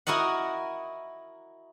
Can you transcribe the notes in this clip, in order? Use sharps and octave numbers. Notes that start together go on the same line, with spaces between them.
E4 F#4 A#4 D#5 F#5